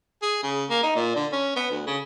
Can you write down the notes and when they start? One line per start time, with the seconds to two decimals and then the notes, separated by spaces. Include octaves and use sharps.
0.22 G#4
0.43 C#3
0.70 A#3
0.83 D#4
0.96 A#2
1.16 D3
1.32 C#4
1.56 B3
1.70 D2
1.87 C#3